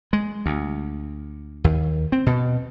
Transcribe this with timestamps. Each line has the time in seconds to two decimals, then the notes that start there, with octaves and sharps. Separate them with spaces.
0.13 G#3
0.46 D2
1.64 D#2
2.12 C4
2.26 B2